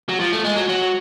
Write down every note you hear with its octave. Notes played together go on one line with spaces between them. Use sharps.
F#3
F3
A3
G#3
F#3
F#3